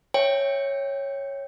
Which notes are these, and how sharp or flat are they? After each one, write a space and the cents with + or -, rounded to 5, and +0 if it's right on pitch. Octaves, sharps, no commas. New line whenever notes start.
C#5 -5 E5 +0 G5 +10